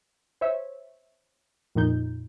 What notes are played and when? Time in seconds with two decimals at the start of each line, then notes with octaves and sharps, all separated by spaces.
0.41 C5 C#5 E5
1.75 F2 A#2 D#4 G6